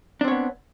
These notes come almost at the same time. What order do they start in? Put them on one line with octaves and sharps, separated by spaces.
D4 C4 C#5 B3